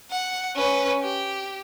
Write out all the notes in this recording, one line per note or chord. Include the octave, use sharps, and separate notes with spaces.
F#5
C#4 B4
G4